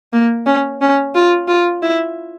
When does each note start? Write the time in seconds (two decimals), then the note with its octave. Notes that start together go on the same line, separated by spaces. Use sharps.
0.13 A#3
0.46 C#4
0.81 C#4
1.15 F4
1.48 F4
1.82 E4